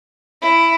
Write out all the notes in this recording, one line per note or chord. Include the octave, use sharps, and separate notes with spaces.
E4